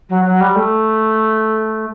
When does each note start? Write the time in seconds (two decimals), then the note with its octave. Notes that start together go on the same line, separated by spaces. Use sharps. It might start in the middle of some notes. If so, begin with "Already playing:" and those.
0.09 F#3
0.25 F#3
0.41 G3
0.56 A3